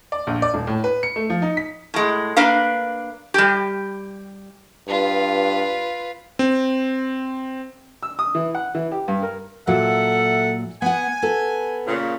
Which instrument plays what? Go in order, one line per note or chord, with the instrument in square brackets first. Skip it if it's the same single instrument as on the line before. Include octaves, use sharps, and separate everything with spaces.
[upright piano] D5
A#1
D5
D#1
A2
B4
C#7
A3
F3
D#4
B6
[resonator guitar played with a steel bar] A2 G#3
A#3 D4 B4 F5
G3 G4
[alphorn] G2 [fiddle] F4 B4
[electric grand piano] C4
[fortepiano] E6
D#6
E3
F#5
E3
G4
G2
A#4
[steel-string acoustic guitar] A#2 F#3 [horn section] A4 E5 F#5
[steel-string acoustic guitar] B3 F#5 [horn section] G#5
[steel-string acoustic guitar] B3 A4
[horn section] A#2 C#3